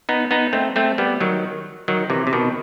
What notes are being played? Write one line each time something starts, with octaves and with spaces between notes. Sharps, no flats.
B3 D#4
B3 D#4
A3 C4
A3 C4
G3 B3
D#3 F#3
D#3 F#3
C3 E3
C3
B2 D#3